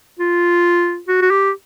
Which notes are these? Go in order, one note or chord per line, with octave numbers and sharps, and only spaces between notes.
F4
F#4
F#4
G4